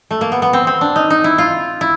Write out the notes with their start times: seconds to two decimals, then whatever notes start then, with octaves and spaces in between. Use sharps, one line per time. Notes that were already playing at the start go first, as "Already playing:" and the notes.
0.11 A3
0.21 A#3
0.32 B3
0.42 B3
0.53 C4
0.67 C4
0.81 D4
0.96 D#4
1.10 D#4
1.24 E4
1.38 F4
1.81 E4